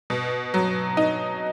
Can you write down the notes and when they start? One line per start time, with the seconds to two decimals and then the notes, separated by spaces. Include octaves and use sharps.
0.10 B2
0.54 F#3
0.97 D#4